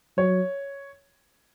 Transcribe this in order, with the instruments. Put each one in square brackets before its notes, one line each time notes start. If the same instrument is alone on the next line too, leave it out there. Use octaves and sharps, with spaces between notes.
[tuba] F#3 [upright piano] C#5